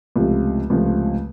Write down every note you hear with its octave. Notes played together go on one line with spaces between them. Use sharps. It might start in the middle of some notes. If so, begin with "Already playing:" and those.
C#2 C3 F3 A3
C#2 C3 F3 A3